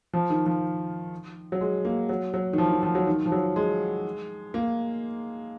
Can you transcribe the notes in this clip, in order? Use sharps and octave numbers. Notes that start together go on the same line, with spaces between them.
F3
D#3
F3
F#3
G#3
A#3
F#3
F#3
D#3
F3
D#3
F3
F#3
D#3
F3
F#3
G#3
A#3